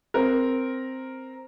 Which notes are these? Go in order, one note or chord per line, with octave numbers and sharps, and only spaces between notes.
C4 A#4